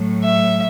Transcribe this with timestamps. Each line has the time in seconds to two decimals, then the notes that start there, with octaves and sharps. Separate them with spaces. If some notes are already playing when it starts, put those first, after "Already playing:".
Already playing: A2 F#3
0.24 E5